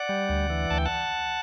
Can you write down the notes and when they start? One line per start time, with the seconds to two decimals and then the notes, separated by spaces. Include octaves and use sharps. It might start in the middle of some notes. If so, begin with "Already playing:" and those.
Already playing: D5 F#5
0.09 G3
0.29 D2
0.50 E3
0.70 D2 A5
0.78 G5
0.85 F#5 A5